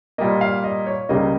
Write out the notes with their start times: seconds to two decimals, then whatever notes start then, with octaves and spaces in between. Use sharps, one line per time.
0.18 A#2 G3 A#3 D#5
0.41 F5
0.64 D#5
0.87 C#5
1.09 C#2 C#3 G3 A#3 D#5